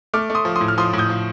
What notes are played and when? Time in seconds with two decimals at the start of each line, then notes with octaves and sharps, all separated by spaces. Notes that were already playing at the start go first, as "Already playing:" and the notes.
0.14 A3 D6 F6
0.30 A3
0.35 C6 D#6
0.45 F3
0.56 C6 D#6
0.61 A2
0.68 F6
0.78 F3 C6 D#6
0.93 A2
0.98 D#6 G6
1.09 F3